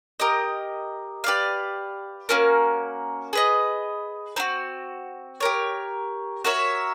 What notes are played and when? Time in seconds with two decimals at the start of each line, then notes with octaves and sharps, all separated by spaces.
0.20 G4 A#4 D#5
1.24 G4 B4 D5 F5
2.29 A#3 C#4 F#4 A#4
3.33 G#4 B4 D#5
4.36 C4 D#4 F#4
5.40 G4 A#4 C#5
6.44 F#4 A#4 C#5 E5